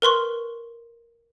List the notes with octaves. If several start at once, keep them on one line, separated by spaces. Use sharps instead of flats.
A#4 B4 C6 C#6